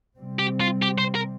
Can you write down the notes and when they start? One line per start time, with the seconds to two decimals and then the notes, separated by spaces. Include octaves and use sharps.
0.17 C3 G3 C4
0.39 G4
0.60 F4
0.82 G4
0.98 C5
1.15 A#4